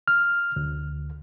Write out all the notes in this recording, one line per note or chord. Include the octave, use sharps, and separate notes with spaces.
F6
D2